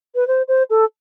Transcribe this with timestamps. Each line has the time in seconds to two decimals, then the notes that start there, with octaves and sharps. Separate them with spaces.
0.15 B4
0.28 C5
0.48 C5
0.70 A4